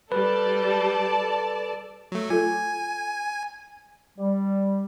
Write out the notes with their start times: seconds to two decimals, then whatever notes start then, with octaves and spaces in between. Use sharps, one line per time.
0.12 G3 A4 B4 D5 A5
2.12 F#3 A3
2.30 F4 A4 G#5
4.19 G3